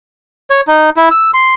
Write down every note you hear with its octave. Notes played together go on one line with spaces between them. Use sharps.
C#5
D#4
E4
E6
C6